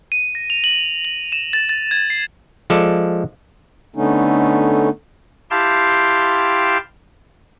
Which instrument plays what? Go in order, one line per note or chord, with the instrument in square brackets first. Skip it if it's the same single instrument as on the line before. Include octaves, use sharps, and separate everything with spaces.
[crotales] D#7
A#6
F7
F#7
F#7
E7
A6
A6
G#6
C7
[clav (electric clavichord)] F3 G#3 A4 D5
[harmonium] D3 A3 B3 C#4 D#4
[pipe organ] E4 G4 F5 G5 A5 C6